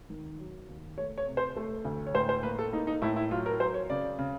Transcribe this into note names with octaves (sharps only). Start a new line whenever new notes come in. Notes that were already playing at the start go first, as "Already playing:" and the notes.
D#3
F#3
D#2
A3 C#5
C#5
C3
C5
A3
D2
C#5
A2 C5
C5
A#3 B4
A4
A#3 D#4
D#4
A2 E4
E4
F#3 F4
A#4
F#3 C5
C#5
C#3 D5
C#3